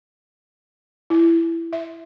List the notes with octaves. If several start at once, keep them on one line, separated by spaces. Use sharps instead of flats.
E4
E5